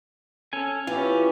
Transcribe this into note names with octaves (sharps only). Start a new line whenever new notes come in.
C#4 A4 G#5
E3 C#4 E4 F4 G4